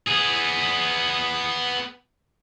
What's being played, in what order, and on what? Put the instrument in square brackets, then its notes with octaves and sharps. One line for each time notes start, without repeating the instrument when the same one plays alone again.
[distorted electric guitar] B3 G#4